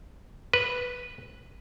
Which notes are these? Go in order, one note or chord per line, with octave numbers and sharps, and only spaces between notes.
B4